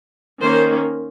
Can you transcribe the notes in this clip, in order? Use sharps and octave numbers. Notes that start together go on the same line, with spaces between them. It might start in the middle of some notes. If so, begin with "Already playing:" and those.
D#3 A#3 C#4 C5